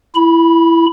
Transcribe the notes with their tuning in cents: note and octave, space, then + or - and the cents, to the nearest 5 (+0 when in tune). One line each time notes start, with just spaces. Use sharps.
E4 +15 B5 -15